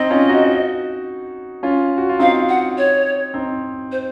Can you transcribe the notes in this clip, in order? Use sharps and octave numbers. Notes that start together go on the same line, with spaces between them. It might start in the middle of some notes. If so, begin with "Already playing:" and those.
Already playing: C4 D#4 D#5
C#4 F4
D#4 F#4
C#4 F4
F#4
F4
C4 D#4 F5
F#5
C#5
C4 D#4
C5